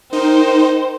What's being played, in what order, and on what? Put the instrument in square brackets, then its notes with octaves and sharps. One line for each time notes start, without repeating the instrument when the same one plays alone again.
[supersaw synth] D#4 [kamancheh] A#4 G5 [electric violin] C5